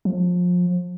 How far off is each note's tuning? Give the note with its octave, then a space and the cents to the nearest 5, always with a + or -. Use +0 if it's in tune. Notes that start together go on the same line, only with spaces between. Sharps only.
F3 +30